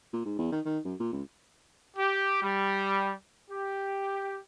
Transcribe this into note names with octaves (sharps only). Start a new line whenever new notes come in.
A#2
G#2
E2
D#3
D#3
F#2
A#2
C#2
G4
G3
G4